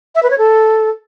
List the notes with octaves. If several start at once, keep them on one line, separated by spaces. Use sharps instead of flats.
E5
B4
C#5
A4